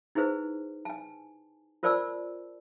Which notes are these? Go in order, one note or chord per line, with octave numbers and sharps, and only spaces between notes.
D#4 E4 G#4 B4 C5
G#5 A5
F4 A#4 C5 D5 A5 E6